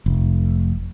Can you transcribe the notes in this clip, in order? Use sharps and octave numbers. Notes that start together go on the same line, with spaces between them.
F1